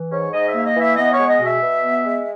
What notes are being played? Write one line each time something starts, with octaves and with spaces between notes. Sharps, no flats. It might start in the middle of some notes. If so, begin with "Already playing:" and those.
Already playing: E3
G#2 C#5
G#2 D#5
E5
A#3
D#5
E3
E5
B3 D#5
C#5
G#3
D#5
B2
E5
B2
B3
G#3